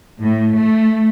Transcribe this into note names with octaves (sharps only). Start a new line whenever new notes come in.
A2
A3